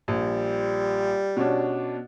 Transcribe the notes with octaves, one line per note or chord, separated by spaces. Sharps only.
A#1 G3
B2 C#4 D4